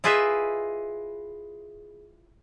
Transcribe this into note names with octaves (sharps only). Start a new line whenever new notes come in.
E4 F4 G#4 B4 D#5 E5